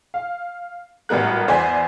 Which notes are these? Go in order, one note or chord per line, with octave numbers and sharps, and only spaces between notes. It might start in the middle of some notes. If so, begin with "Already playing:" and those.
F5
G#1 A2 G3 B3 A#4 F#6
E2 C5 D5 G#5 B6